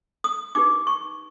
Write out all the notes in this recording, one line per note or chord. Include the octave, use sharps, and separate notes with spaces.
D#6
D#4 G4 B4 D6
C#6